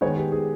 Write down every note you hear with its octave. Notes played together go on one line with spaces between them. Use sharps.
D#3 G#3 B3 C#5
G4
G#4